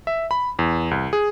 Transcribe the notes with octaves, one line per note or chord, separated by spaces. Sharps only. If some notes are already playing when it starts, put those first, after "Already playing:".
E5
B5
E2
C2
G#4